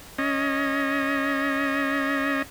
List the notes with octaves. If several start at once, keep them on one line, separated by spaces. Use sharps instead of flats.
C#4 D#5